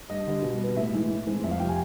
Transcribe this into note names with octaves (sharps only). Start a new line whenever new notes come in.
G2 D#5
D3 G3
B2
G3 B3
A2 E5
E3 G#3
A2
E3 G#3 C4
F2 E5
F5
C3 F3 G5
G#5